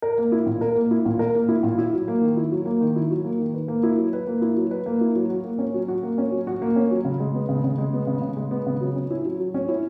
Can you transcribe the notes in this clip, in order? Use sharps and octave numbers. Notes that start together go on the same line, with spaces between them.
A#4
A#3
E4
A#2
A#4
A#3
E4
A#2
A#4
A#3
E4
A#2
E4
F#3
A#3
D#3
E4
F#3
A#3
D#3
E4
F#3
A#3
D#3
B4
A#3
E4
F#3
B4
A#3
E4
F#3
B4
A#3
E4
F#3
F#4
A#3
C#4
F#3
F#4
A#3
C#4
F#3
F#4
A#3
C#4
F#3
C#3
G#3
B3
C#3
C#3
G#3
B3
C#3
C#3
G#3
B3
C#3
F#3
C#4
E4
F#3
F#3
C#4
E4